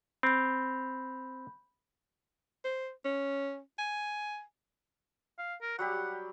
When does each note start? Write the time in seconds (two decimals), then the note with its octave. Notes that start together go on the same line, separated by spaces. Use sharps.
0.23 C4 B5 G6
2.64 C5
3.05 C#4
3.79 G#5
5.38 F5
5.62 A#4
5.79 F#3 G3 G4 F#5